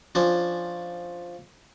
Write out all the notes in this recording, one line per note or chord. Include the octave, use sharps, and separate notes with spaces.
F3 C#4 D4